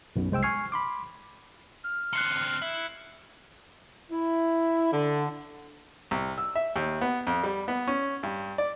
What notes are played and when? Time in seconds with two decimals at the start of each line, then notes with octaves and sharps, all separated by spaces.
0.16 B1 F#2 B2
0.31 C2 G#3 C5 G5 E6
0.43 G#5 C#6 F6 G#6 C7
0.72 B5 C6 D6
1.83 F6
2.13 D3 C4 F#6 C7 C#7
2.62 E4
4.11 E4
4.93 D3
6.11 C2
6.38 E6
6.56 E5
6.76 D#2
7.01 B3
7.27 F2
7.43 G3
7.68 B3
7.87 C#4
8.23 G2
8.58 D5